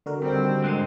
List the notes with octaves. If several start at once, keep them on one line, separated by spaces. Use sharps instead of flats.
D3 F#4 A#4
D#3 G3 C4
G#2 E3 G#3 F#6 C7 D#7